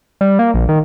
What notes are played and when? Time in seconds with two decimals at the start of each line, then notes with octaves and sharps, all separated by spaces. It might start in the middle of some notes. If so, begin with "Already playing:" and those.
0.21 G3
0.39 A#3
0.54 A#1
0.69 D#3